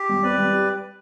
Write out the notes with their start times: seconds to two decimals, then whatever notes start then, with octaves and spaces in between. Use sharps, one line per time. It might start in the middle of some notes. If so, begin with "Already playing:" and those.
Already playing: G4
0.09 G3
0.23 C4 B4 D5
0.38 G3
0.53 G4